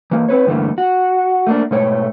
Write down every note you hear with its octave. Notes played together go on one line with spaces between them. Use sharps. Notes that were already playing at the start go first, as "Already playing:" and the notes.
E3 A#3
C4 B4 C#5
G2 D3 E3 A3 A#3
F#4
A3 A#3 D4
G#2 B2 A3 C#5